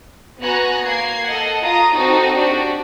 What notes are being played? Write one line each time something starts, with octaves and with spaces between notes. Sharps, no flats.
B3 F#4 G#5 A#5 F#6
A#3 G#6 C7
A4 D#5 F#5
F4 A#5 D#6
C4 D#4 F#4 A4
D4 F#4 G4